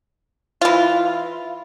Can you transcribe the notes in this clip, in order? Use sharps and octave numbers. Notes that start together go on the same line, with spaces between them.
E3 F4